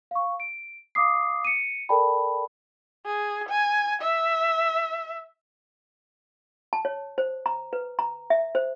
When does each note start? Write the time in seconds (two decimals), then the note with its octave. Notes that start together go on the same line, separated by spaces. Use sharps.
0.11 F5 C#6
0.40 D7
0.95 F5 D6 D#6 C7
1.45 C#7 D#7
1.89 A4 A#4 D5 G5 A5 B5
3.05 G#4
3.49 G#5
4.02 E5
6.73 A5
6.85 C#5
7.18 C5
7.46 A#5
7.73 B4
7.99 A#5
8.30 E5
8.55 C5